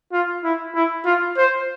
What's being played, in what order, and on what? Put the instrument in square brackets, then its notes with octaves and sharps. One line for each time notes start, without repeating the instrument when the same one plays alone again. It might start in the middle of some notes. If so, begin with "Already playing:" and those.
[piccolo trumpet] F4
E4
E4
F4
C5